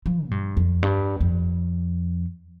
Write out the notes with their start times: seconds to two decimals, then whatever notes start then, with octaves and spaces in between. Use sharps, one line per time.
0.06 F3
0.27 A2
0.31 G2
0.57 F2
0.83 G2
1.21 F2